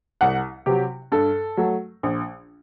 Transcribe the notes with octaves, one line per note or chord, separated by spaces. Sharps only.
C2 F#5
C3 F#3 G4
G2 A4
F#3 A3
A#1